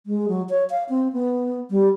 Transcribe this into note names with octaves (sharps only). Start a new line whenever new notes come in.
G#3
F#3
C#5
F5
C4
B3
G3